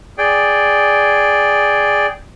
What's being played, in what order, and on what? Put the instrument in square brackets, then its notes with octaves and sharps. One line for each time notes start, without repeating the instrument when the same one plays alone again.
[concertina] G#4 D5 G5